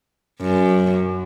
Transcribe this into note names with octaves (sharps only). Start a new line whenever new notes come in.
F#2